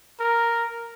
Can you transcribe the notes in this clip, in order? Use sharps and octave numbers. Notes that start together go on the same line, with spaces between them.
A#4